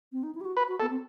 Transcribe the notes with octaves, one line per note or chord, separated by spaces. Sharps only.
C4
D#4
E4
G4
F#4
B4
F#4
B3 A4
C4